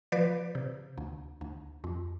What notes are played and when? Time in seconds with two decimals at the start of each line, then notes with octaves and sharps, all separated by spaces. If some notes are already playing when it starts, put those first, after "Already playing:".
0.12 F3 B4 D5
0.55 C3
0.98 D2
1.41 D2
1.84 F2